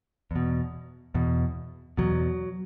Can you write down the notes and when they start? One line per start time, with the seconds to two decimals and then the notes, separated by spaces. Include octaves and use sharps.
0.31 E2 B2
1.14 E2 B2
1.97 E2 B2 F#3